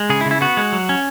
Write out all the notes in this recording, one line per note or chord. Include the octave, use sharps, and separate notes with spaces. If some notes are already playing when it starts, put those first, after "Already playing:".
Already playing: G#3
C#3 G#4
E4
C#3
E4
B3 F#4
G#3
F#3
C#4